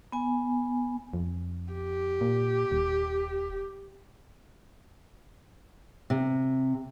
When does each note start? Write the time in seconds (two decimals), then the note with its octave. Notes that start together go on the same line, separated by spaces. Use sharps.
0.12 B3 G#5
1.13 F2
1.73 G4
2.21 A#2
2.72 D#1
6.10 C3